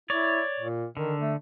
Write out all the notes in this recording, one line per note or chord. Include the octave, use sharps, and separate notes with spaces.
E4 C#5 D5
A#2
D3 D#3
A3